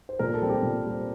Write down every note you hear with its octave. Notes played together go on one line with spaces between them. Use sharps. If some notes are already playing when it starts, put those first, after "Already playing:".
C5
A#2 A#4
A4
G3 C4
G4
A#2
G3 C4